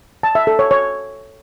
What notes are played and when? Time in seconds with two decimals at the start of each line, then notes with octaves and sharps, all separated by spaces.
0.23 A5
0.35 E5
0.47 A4
0.59 C#5
0.71 C#5